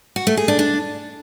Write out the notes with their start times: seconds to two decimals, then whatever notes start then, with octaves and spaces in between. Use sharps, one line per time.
0.16 F#4
0.27 A3
0.37 G#4
0.48 D4
0.59 D4